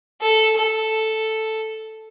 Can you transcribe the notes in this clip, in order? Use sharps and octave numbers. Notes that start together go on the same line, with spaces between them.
A4
A4